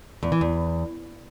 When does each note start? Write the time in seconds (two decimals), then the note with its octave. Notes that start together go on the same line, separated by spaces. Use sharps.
0.23 E2
0.32 E3
0.41 E2